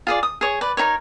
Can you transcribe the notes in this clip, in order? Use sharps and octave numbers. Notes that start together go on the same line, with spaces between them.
F4 G#4 D5
D#6
G#4 C#5
B4 D5
D#4 E4 A#4 C#5